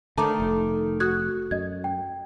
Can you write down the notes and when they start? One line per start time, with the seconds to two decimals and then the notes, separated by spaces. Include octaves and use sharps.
0.18 D3 D#3 A3 A5 A#5 D6
0.40 F1
1.00 F#4 D#6 F#6 G#6
1.51 F#2 D#5 G#6
1.84 G5